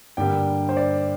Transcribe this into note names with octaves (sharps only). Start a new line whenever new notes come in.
G2 D3 G3 A#3 G5
C5
D5